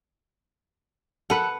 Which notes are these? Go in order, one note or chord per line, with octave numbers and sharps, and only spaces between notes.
A4 B4 F#5